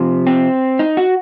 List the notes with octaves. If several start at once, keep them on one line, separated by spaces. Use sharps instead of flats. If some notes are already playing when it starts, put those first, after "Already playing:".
Already playing: C3 F3
C4
D#4
F#4